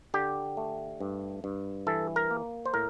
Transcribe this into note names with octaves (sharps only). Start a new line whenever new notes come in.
D3 G4
A3
G2
G2
E3 A4
A#4
A#3
C5
A2 A#4